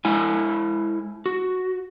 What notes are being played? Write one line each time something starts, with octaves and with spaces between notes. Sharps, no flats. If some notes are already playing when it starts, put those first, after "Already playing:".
G#3 E4 G#5
F#4